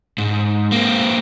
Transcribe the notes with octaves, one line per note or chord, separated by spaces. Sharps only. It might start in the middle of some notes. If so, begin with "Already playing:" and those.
G#2
A#3 C4